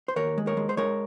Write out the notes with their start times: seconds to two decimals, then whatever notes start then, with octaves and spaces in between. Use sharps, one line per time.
0.08 C5
0.16 D#2 A#4 C#5
0.38 G#3
0.47 A#4 C#5
0.57 G#3
0.69 C5
0.77 G#3 A#4 C#5